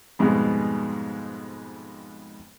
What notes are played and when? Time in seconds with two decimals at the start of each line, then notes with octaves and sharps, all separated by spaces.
0.19 F2 G#2 B2 G3 G#3 B3